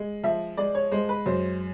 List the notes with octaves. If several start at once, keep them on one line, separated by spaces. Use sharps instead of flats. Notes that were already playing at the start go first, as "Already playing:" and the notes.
Already playing: G#3
F3 E5
G#3 D5
C#5
G#3 C5
B4
F#2 C5